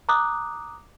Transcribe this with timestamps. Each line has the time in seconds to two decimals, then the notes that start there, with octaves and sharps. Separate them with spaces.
0.09 A#5 D6 D#6 F#6